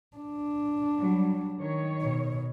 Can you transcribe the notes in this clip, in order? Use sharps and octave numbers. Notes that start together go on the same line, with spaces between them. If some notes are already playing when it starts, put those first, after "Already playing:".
D4
F#3 G3
D#3 C#5
B2